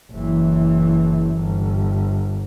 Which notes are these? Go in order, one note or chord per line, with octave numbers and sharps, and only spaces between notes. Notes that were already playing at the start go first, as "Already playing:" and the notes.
F#1 E3
G1